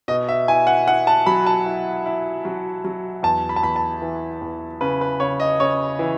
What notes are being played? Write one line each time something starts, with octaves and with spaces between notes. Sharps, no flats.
B2 D#5
E5
E4 G#5
F#5
E4 F#5
A5
F#3 B5
A5
E4
E4
F#3
F#3
E2 A5
B5
A5
E2 B5
A5
E3
E2
C#3 B4
B4
C#3 C#5
D#5
C#3 C#5
E3